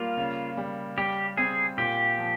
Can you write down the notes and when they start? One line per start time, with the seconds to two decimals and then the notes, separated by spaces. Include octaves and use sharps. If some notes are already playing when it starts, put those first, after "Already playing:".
Already playing: G3 A#3 F4
0.17 C#3
0.57 G3
0.98 G3 G4
1.37 C4 G#4
1.78 A#2 G4
2.18 F3